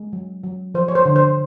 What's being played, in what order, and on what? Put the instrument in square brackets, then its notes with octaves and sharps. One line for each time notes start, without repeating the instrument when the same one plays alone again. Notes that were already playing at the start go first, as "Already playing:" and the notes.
Already playing: [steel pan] G#3
F#3
F#3
F3 C5
C#5
C5
D3
C5